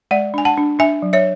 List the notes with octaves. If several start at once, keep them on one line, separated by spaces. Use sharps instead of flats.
G#3 D5 F#5
D4 G#5
F#5 A5
D4
D4 E5 G#5
F#3
C#5 E5